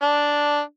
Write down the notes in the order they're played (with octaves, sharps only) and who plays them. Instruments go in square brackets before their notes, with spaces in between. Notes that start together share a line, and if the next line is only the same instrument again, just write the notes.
[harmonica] D4